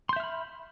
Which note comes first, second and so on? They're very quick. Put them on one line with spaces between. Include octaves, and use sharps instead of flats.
C6 G6 E5 F6 B5